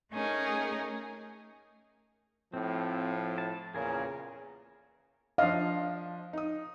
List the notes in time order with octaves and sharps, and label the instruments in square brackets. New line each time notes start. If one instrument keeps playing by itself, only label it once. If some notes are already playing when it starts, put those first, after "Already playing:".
[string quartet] A3 C#4 D#4 G#4 A#4
[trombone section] A2 F3 [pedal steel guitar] C4
[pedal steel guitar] A5
[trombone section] E2 A#2 C#3 [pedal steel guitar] G#4 A#4
[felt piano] F3 D4 D#5 [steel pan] F5
[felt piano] D#4 D#6